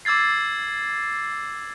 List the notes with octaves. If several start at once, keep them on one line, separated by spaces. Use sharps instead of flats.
D6 E6 G#6 A6 C7